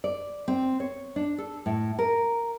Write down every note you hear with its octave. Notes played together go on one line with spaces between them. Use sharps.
D5
C4
C#5
D4
A4
A2
A#4